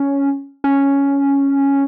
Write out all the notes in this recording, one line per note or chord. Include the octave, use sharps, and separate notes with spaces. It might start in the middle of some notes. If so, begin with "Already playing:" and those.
Already playing: C#4
C#4